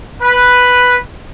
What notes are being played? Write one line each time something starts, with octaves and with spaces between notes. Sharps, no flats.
B4